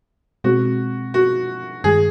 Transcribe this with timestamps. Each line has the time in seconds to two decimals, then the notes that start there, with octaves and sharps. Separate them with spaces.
0.44 B2 G#3 C4 F#4
1.14 F#4
1.84 G2 D#3 G#3 G#4